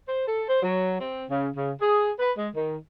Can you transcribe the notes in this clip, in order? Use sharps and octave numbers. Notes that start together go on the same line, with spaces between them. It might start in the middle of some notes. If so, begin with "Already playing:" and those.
C5
A4
C5
F#3
C4
C#3
C#3
G#4
B4
G#3
D#3